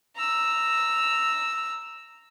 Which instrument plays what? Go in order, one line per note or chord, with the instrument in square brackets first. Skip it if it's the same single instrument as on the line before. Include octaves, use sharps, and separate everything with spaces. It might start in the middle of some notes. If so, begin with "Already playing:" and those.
[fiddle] A#5 E6